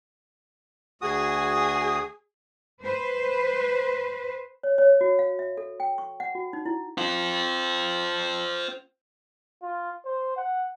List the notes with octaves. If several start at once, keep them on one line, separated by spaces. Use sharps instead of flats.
D2 F#4 G#4 D#6
B4 C5
C#5
C#5
F#4
F5
E5
A4
G5
C#6
F#5
F#4
D#4
E4
C4 F4
F4
C5
F#5